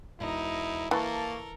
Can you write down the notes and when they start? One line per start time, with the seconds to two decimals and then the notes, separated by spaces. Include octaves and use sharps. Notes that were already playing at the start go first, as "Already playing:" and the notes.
0.20 E1 D#4 E4 A#4
0.91 E3 A#3 A4 A#4 A5 C#6